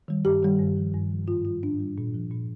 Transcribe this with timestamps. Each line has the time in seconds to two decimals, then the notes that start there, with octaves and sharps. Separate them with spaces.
0.08 D#3 G3
0.25 G2 G4
0.43 D#3 G3
0.59 G2
0.77 F3
0.94 G2
1.10 F3
1.28 G#2 F4
1.45 G3 F4
1.63 G#2 D4
1.80 G3
1.98 A#2
2.14 F3
2.32 A#2